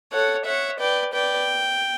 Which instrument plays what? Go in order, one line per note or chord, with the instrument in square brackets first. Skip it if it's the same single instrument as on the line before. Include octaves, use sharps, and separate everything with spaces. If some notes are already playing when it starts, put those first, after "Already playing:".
[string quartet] A4 C#5 [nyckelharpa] F#5
[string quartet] C#5 E5 [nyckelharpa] F#5
[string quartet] B4 D5 [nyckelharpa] G5
[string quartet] B4 D5 [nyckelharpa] G5